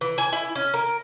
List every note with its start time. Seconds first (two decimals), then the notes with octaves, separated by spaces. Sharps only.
0.01 E3
0.18 G#5
0.33 E4
0.55 C#4
0.74 A#4